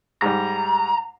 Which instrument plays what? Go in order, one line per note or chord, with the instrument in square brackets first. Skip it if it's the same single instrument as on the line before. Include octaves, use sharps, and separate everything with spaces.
[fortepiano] G#2 G3 [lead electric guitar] A#5